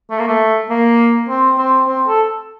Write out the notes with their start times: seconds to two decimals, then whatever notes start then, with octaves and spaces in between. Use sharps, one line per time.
0.10 A3
0.19 A#3
0.27 A3
0.70 A#3
1.29 C4
1.58 C4
1.88 C4
2.07 A4